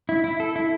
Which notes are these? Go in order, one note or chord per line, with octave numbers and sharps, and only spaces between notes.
E4
E4
A4
E4